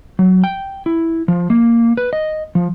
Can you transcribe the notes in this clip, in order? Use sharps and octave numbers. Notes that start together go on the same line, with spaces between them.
F#3
G5
E4
F3
A#3
B4
D#5
F3